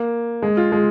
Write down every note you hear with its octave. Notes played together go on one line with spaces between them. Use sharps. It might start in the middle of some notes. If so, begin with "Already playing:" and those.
Already playing: A#3
G#3
F4
G#3